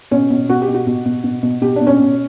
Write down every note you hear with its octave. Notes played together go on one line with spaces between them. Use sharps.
B2 C#4
B2
B2 F#4
G4
B2
F#4
B2
B2
B2
B2
B2 G4
B2 D4
C#4
B2